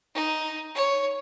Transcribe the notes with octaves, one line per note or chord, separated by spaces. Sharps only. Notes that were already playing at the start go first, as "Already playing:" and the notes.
D#4
C#5